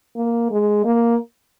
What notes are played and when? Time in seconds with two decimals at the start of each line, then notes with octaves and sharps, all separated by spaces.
0.17 A#3
0.51 G#3
0.85 A#3